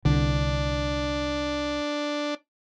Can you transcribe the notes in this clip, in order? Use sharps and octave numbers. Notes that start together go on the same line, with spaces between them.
C2 D3 D4